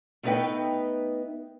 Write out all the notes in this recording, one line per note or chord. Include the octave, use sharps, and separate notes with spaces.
A3 B3 D#4 B4 E5 G5